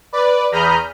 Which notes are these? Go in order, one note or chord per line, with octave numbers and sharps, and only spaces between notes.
B4 D5
E2 A#5 B5 D#6 F6 G6